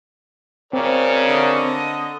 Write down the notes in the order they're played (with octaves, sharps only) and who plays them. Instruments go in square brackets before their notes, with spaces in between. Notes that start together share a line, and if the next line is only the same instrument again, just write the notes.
[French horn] C#3 [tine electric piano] C4 [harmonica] A#4 C#5 D5
[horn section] D3 D#5